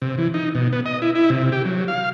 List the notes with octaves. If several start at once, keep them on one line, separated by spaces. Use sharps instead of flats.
C3
E3
D#4
B2
B3
D#5
E4
E4
C3
G4
F#3
F5